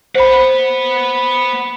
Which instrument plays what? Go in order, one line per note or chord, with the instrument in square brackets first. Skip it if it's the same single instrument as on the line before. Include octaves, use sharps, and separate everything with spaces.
[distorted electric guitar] B3 F#5 [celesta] C5 B5